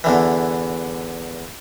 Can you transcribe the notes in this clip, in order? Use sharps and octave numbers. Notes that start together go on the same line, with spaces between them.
E2 D3 E3